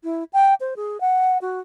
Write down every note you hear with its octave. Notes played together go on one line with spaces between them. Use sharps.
E4
G5
C5
G#4
F#5
F#4